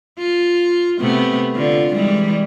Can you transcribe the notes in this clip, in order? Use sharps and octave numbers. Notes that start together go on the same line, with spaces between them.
F4
C3 A3 B3
D3 F4
E3 G3 G#3